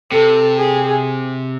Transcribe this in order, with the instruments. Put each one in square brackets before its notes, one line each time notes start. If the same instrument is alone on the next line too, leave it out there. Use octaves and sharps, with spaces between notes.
[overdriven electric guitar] C3 [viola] A4
[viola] G#4